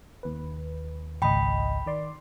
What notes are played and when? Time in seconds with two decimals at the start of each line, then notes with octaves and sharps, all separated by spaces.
0.23 D#2 B4
1.22 G#1 C#2 D#5 G5 B5
1.86 D#3 D5 C6